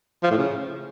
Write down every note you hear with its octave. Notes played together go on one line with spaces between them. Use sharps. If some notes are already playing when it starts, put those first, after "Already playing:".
F3
A2
C#3